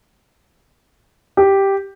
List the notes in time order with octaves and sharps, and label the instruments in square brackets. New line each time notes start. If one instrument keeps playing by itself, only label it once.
[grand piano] G4